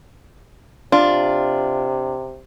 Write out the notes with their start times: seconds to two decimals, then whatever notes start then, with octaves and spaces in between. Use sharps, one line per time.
0.92 C3 D4 F4